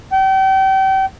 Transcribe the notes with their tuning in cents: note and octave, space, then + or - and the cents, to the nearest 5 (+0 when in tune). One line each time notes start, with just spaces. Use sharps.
G5 -35